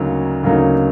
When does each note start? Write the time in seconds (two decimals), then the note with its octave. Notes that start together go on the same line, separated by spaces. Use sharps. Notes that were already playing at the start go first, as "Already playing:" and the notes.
Already playing: D2 C#3 F#3 A#3 D#4
0.44 D2 C#3 F#3 A#3 D#4